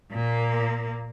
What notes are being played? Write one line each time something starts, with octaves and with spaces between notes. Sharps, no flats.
A#2 A#3